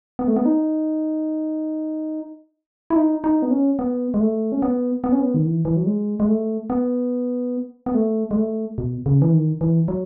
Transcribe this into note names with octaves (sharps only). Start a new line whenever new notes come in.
B3
A3
B3
D#4
E4
D#4
D#4
B3
C#4
B3
G#3
A3
C#4
B3
B3
C#4
B3
D#3
E3
E3
F#3
G#3
G#3
A3
B3
B3
A3
G#3
A3
B2
C#3
E3
D#3
E3
F#3